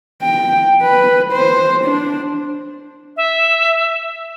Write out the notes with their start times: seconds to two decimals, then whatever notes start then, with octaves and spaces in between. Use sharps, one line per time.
0.22 G5
0.82 B4
1.33 C5
1.84 D4
3.17 E5